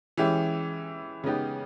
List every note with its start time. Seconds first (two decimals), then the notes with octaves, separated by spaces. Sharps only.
0.17 E3 G#3 C#4 E4 G4
1.24 C#3 G#3 B3 D#4 G4